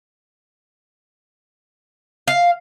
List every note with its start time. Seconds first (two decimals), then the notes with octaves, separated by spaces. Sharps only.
2.28 F5